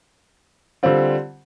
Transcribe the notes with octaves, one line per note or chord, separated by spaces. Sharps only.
D3 G3 C4 F4